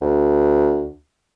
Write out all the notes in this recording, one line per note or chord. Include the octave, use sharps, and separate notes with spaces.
D2